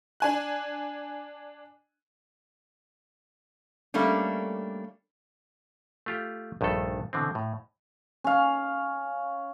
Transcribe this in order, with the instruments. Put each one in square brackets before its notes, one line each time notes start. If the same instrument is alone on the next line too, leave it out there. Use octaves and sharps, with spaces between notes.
[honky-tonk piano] D4 G#5 F#6
[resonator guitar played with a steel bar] G3 A3 A#3 C#4 D4
[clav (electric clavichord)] A3 F4 G4
A#1 G2 D#3 A3 A4
B2 D3 E3 C4
A2
[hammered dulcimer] C#4 F5